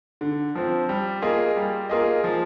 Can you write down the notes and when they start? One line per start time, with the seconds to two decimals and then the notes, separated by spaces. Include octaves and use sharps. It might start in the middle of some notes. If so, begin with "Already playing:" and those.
0.21 D3
0.55 F3 C4
0.89 G3
1.22 A#3 F4 G#4 D#5
1.57 G3
1.89 A#3 F4 G#4 D#5
2.24 F3